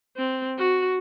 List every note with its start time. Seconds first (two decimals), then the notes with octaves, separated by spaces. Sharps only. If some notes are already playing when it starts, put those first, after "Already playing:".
0.16 C4
0.58 F#4